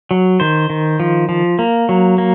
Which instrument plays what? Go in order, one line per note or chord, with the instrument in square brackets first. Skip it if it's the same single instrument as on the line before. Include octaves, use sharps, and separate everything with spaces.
[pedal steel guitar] F#3
D#3 C5
D#3
F3
F3
A#3
F#3
A#3